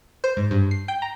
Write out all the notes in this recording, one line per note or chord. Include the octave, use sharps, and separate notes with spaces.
C5
G#2
G2
C7
G5
A#5